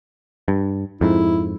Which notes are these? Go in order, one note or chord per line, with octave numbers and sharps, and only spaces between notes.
G2
F2 G#2 E4